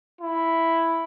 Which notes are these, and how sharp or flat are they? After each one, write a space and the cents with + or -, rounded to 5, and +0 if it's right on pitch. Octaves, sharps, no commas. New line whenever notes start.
E4 +0